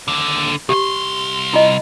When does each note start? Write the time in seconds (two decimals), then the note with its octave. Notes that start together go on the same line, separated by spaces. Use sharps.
0.08 D#2 D3
0.69 C2 G4 C6
1.53 E4 F4 D#5